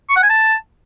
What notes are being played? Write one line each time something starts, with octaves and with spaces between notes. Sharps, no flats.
C#6
F#5
G#5
A5